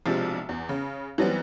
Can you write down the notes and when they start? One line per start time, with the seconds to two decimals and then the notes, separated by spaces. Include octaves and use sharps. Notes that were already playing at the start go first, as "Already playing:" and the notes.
0.06 B1 C3 F3 G#3 D4
0.49 E2
0.69 C#3
1.18 E3 F#3 G3 B3 C4